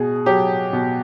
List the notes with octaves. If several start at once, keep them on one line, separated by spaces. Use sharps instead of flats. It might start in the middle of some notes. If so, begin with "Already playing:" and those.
Already playing: B2 G#4
F#3 G4
B2